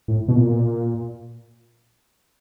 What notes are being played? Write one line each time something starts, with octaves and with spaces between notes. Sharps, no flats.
A2
B2
A#2